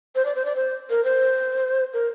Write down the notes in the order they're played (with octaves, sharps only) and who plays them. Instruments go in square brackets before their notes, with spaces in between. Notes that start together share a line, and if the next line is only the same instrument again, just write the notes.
[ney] C5
D5
C5
D5
C5
A#4
C5
A#4